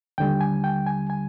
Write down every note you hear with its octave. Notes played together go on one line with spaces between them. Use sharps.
D#2 D3 G3 G5
G#5
G5
G#5
G#5